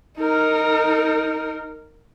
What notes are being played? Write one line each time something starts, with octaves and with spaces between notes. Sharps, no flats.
D#4 A#4